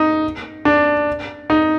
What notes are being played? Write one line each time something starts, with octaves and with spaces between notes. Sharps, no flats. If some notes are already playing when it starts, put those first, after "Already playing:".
Already playing: D#4
D4
D#4